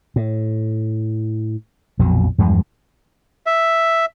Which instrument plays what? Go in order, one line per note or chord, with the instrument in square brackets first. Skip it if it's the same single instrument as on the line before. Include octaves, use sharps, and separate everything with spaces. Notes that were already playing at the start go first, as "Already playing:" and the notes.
[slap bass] A2
A#1 F2 B2 F#3
E2 G2 F3 G#3
[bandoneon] E5